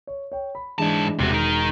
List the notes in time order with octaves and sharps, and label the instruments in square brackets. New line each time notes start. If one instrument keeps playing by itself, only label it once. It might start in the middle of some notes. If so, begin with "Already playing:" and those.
[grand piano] C#5
C#5 G5
B5
[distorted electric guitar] G#2 A5 [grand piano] E3 G#3 D4
[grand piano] E1 [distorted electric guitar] C3 F#4
[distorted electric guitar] D#4 A#4